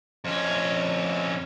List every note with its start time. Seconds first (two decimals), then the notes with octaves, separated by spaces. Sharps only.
0.25 F2 C#4